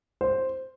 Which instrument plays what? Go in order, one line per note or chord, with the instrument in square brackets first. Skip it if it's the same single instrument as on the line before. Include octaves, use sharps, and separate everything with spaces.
[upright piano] C5